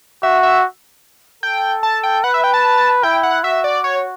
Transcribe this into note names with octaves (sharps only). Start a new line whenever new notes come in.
F#4 E5
E5
A4 G5
A5
G5
B4 F#5
E5
G5
A5
E4 G5
F#5
F#4 E5
D5
C#5